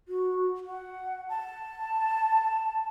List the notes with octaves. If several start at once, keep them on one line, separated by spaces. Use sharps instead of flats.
F#4
F#5
A5